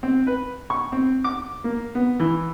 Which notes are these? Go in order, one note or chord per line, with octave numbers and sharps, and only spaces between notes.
C4
B4
C#6
C4
D6
A#3
B3
E3